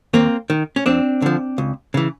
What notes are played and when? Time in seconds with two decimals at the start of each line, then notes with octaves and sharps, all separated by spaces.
0.14 D#2 A#3 C4
0.50 D#3
0.76 C#4
0.86 F2 C4 D4
1.22 D3 F3
1.58 C#2
1.94 C#3 E3